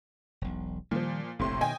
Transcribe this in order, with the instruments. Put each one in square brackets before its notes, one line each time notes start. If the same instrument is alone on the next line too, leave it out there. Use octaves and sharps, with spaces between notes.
[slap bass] E1 B1
[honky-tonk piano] A#2 F3 [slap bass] D#3 G3
[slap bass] F1 A#1 [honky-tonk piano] A2 C3 C6
[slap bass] B2 D#3 [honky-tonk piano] D#5 G5 G#5